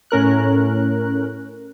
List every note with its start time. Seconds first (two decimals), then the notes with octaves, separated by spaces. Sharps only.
0.11 A2 C#4 A#4 F#6